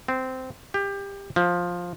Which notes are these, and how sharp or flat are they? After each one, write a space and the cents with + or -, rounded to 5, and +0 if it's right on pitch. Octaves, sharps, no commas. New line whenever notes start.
C4 -15
G4 +25
F3 +10